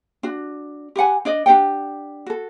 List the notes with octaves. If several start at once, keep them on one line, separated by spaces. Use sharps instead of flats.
D4 F#4
G4 B4 F#5 G#5
D4 D5 D#5
D4 G4 F#5 G5
F#4 A4